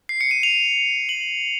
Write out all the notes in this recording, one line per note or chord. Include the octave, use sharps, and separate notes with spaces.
C7
C#7
D#7
F7
F#7